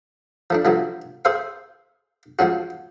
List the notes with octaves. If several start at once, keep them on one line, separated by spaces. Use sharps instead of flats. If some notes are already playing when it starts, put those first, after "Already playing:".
F3 A3 D4
G2 F3 F#3 A3
G#4 C5 E5 F5
F3 G#3 C#4 F#4